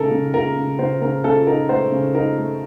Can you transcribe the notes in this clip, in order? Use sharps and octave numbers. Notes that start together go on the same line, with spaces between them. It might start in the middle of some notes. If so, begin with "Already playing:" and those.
Already playing: C#3 D#4 A4 A#4
C#3
C#3 A#4
C#3
C#3 C5
C#3 A#4
C#3 A4
D#4 A#4
A3 C5
C#3
D#4 A#4
A3